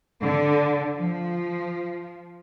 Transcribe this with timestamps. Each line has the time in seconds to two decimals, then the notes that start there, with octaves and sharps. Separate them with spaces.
0.21 D3
0.98 F3